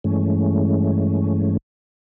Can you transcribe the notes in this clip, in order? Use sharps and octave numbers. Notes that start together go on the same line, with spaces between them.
G2 E3 G#3 A3 C#4